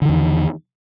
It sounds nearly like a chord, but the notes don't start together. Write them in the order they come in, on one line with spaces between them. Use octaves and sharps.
D3 D#3 E2